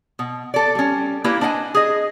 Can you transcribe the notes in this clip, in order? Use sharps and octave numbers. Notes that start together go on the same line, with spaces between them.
B2
A4 D5
G3 C#4
A#3 E4 G4 B4 D5
D4 C5 D#5 F#5 G#5
G#4 D#5